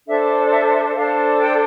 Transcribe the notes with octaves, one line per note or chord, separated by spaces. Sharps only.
D4 A4 C5 E5
D5
D5
E5
E5
D4 A4 C5 F5
G5